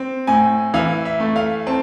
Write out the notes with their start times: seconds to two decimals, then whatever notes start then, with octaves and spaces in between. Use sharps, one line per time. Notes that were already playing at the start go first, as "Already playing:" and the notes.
Already playing: C4
0.27 A2 G#5
0.74 E3 F5
1.05 E5
1.20 A3
1.36 F5
1.67 C4 A5